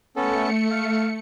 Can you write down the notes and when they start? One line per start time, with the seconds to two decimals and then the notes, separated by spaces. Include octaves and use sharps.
0.16 A3 B3 C#4 A4 C#7
0.71 F5